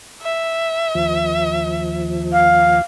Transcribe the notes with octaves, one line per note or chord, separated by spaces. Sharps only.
E5
D#2 F3
F5